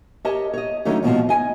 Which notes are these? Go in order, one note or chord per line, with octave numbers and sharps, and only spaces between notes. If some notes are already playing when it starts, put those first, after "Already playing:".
G4 A#4 C#5 D#5 A5
C#5 D#5
D3 D#3 F#3 A3 C#4 D#4
D#2 G#2 B2 D#3 F3
D#5 G#5